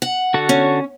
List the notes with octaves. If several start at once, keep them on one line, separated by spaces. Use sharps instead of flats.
F#5
D3 F#4 A4
C#4